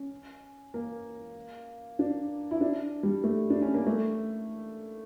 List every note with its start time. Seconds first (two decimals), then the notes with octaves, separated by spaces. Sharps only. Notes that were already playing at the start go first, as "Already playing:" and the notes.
Already playing: C#4
0.74 A#3
1.99 D4
2.51 E4
2.61 D4
3.03 G3
3.24 A3
3.50 D4
3.62 C#4
3.74 A#3
3.87 A3